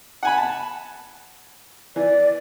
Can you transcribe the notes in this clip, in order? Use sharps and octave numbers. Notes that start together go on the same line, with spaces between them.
F#5 G#5 B5
A5
E3 D5